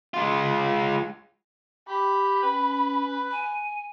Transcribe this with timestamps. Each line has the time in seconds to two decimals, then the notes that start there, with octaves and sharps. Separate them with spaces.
0.14 G#3 F4
1.88 G4 B5
2.42 C#4 B4
3.31 G#5